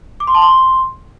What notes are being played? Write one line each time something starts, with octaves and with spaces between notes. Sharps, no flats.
D6
C6
A5
C6